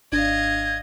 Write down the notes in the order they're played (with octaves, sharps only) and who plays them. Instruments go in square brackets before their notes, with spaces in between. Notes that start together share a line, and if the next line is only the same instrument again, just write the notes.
[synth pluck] G#1 D4 [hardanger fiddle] D#5 F5 [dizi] G#6